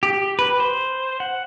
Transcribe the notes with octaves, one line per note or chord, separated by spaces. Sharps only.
G4
B4
C5
F#5